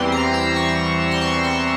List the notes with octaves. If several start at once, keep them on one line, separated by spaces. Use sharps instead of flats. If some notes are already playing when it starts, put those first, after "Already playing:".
Already playing: E2 E3 G3 C4 C6
A#5
E6
C#6
C6
C#6
C6